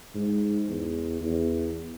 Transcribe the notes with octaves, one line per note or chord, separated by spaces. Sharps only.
G#2
E2
E2